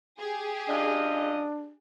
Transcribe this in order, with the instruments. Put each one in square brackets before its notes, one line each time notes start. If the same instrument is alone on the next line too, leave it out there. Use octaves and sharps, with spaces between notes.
[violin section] G4 G#4
[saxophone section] F#2 F4 D#5 [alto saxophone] D4